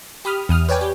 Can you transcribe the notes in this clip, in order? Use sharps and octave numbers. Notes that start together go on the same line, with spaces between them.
G4 B5 D#6 F6
E2 D#6 F6
B4 C#5 D5 G5 G#5
G4